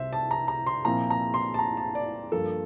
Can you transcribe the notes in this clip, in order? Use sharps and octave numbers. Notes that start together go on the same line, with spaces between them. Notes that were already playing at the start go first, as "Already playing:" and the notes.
Already playing: C2 C3 C5 E5
A5
A#5
A#5
C6
A#2 F3 C4 E4 A#5
A#5
C6
A5
A#5
A5
D5
G2 F3 A#3 A4